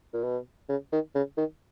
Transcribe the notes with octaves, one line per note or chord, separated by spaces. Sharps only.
A#2
B2
C#3
D#3
C#3
D#3